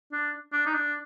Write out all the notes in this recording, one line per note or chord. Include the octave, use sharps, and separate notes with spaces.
D4
D4
D#4
D4